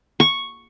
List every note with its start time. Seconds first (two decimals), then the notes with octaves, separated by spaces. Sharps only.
0.20 C#6